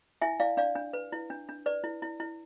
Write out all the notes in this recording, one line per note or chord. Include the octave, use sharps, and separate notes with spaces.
E4 E5 G#5
E4 D5 F5
D4 D5 F5
D4
B4
E4
D4
D4
B4 D5
E4
E4
E4